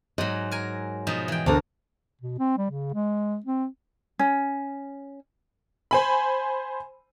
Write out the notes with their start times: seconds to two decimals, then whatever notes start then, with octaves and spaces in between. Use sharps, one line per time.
0.18 G#2 F#3 D#5
0.51 A#4 G#5
1.07 B2 F3 D#4
1.28 E3 G5
1.46 D2 D4 A#4
2.21 B2
2.39 C4
2.58 G3
2.70 C#3
2.94 G#3
3.46 C4
4.19 C#4
5.91 C5 G#5 B5